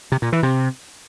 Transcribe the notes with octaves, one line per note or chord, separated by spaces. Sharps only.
C3
A#2
E3
C3